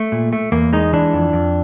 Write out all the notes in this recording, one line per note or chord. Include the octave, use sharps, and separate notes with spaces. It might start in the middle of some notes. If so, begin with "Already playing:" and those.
Already playing: A3
A#2
A3
E2 A#3
G#3 D#4
E3 D4
F2
F2